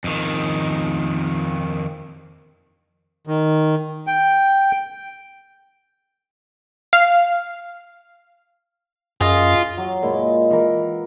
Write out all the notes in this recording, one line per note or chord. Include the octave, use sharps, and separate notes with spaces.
F2 D#3
D#3
G5
F5
F#2 F4 G#4 D#5
F#3
A#2 G#3 E4
E3 A#4